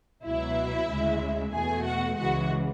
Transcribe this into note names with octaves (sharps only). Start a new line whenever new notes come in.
C#2 B2 F#3 E4 E5
D2 C#3 G#3
E2 B2 A3 G#4 G#5
F#4 F#5
C#2 C#3 E3 G#3 F#4 F#5